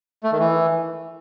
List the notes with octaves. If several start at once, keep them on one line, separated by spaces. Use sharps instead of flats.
A3
D#3
E3